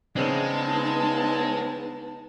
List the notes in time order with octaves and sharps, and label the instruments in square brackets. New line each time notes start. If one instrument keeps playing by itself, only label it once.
[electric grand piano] C#3 C4 D4 [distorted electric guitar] G#3 [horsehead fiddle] B3 D#4 [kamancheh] A5